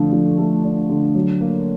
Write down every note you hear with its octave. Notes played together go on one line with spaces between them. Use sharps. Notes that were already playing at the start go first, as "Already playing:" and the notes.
Already playing: D3 F3 A3 D4
F3
A3
D4
D3
F#3
A#3